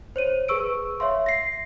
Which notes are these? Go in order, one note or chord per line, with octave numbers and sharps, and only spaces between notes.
C5 C#5 D#7
G#4 B4 C#6 E6 D7
C#5 E5 F5 C6
A#6 C7